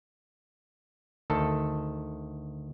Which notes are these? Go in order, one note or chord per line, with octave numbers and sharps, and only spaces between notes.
D2 D#3 A4 A5